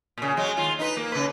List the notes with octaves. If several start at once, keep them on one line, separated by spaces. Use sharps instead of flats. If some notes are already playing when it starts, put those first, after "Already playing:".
A#2 C#3
F#3 G#3
D#2 F4
D#4 B4
A#3
C#3 B4